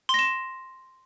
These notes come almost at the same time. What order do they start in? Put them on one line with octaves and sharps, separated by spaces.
C6 A#6 E7